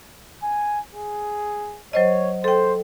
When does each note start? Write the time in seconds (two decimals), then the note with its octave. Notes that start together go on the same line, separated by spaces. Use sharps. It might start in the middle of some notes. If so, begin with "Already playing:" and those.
0.43 G#5
0.94 G#4
1.93 F#3 C5 C#5 D#5
2.44 A4 C5 G5